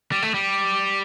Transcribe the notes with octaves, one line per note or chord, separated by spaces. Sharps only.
G3
A3
G3